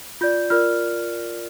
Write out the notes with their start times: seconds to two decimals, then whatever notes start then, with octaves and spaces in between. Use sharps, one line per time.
0.21 F4 D5 G6
0.50 F4 A#4 D5 F6